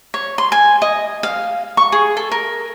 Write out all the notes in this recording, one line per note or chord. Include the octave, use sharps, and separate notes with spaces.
C#5
C6
G#5
D#5
F5
C#6
G#4
A4
A#4